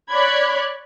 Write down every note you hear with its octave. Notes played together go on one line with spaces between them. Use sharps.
C#5 D5 B5 F#6 G#6